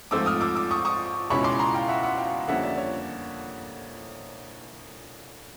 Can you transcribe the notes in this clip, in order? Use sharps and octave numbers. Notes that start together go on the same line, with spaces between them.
G#2 F3 A3 C4 D6 E6
D#6 F6
D6 E6
D6 E6
C#6 D#6
C#6 D#6
C#2 B2 G#3 C#4 E4 B5 C#6
C6 D6
A#5 C6
F5 G5
E5 F#5
E5 F#5
F5 G5
F2 D3 G3 A#3 C#4 E5 F#5
D5 E5
C#5